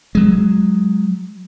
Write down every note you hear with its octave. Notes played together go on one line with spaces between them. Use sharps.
F#3 G#3